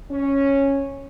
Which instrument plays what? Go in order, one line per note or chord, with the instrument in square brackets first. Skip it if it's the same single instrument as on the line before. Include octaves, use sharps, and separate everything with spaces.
[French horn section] C#4